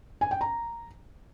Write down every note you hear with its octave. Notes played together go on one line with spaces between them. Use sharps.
G#5
G5
A#5